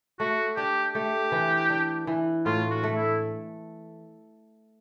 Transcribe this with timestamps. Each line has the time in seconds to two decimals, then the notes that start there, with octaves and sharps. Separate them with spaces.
0.20 A3 F#4
0.57 D4 G4
0.95 A3 G4
1.32 E3
1.70 D4
2.07 E3
2.46 A2 F4
2.71 F#4
2.83 A3
2.96 E4